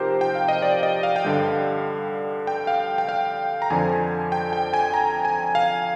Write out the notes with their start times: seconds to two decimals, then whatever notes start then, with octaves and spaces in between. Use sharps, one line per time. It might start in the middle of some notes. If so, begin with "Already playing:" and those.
Already playing: C3 F3 D#4 G4 A#4 C5
0.21 G5
0.35 F5
0.48 D#5
0.62 D5
0.83 D#5
1.03 F5
1.16 G5
1.25 G2 D3 G3 F5
2.47 G5
2.67 F5
2.98 G5
3.09 F5
3.62 A#5
3.70 F2 D3 F3 G#5
4.32 G5
4.53 G5
4.74 G#5
4.94 A#5
5.25 G#5
5.55 F5